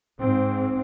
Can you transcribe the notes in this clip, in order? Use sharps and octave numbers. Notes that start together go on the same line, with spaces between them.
G#2 C4